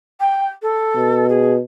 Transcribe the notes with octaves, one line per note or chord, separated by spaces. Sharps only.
G5
A4
B2
G#4